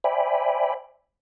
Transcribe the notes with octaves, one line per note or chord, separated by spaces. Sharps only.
C5 D5 E5 G5 G#5 B5